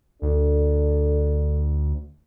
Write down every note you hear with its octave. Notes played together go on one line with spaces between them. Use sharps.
D2 D4 A4